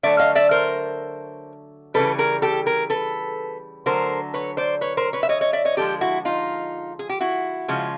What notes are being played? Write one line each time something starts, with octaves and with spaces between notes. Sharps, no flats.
D3 F#3 A3 D5 E5
D#5 F5
D5 E5
A#4 C5
C#3 E3 G3 A4 B4
G#4 A#4
G4 A4
G#4 A#4
A4 B4
D3 F#3 A3 A#4 C5
B4 C#5
C5 D5
B4 C#5
A#4 C5
B4 C#5
E5
C#5 D#5
C#5 D#5
D5 E5
C#5 D#5
D3 F3 G#3 G4 A4
E4 F#4
D#4 F4
G#4
G4
E4 F#4
C#3 F3 G#3